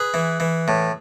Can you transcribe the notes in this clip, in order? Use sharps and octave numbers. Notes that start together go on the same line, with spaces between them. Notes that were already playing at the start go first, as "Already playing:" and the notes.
Already playing: G#4 B4
E3
E3
A2